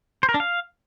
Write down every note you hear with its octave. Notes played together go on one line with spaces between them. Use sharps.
C5
A#4
D4
F5